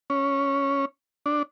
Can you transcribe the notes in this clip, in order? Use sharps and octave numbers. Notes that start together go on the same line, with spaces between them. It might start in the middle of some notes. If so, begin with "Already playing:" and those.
C#4
D4